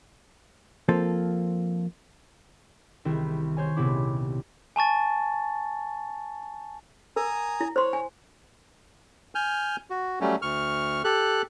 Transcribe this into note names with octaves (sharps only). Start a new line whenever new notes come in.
F3 A#3 C4 F4 A4
C2 D#3 E4
C5 C#5 G#5
D#1 C2 C3 B3 E4 D6
G#5 A5 C#6 A6
A#4 G#5 A#5 D#6
E4
C5 C#5 C6
G#5
G#5 F6 G6
F#4
F#3 G3 A3 C#4
D2 C#6 F6
G4 A4 F#6